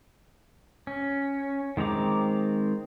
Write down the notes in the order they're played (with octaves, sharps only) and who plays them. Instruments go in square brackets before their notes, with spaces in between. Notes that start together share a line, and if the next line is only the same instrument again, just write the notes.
[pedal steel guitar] C#4
D#3 G#3 C4 A#5 D6